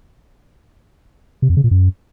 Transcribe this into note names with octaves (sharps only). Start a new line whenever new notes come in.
C3
F2
C#3
A#2
F#2